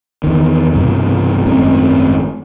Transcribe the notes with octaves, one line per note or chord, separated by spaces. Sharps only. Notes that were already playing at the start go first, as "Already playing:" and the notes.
E2 D#3
B1 G2 C3 E3
G#1 F#2 A2 C4